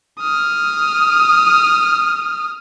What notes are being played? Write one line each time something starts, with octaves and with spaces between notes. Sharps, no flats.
D#6 F6